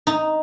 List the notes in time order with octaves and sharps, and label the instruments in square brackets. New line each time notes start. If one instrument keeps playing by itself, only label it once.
[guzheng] D#4